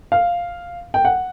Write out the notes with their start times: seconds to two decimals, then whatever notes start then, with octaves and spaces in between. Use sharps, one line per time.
0.12 F5
0.94 G5
1.05 F#5